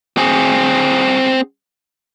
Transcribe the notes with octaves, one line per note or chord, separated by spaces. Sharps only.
C4 G#4